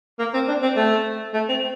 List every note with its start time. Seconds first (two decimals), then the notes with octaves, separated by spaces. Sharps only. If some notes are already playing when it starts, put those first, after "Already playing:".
0.19 A#3
0.34 C4
0.48 D4
0.62 C4
0.76 A3
1.33 A3
1.48 C4